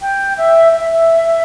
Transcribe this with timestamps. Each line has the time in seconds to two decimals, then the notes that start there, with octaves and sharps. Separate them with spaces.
0.02 G5
0.38 E5
0.73 E5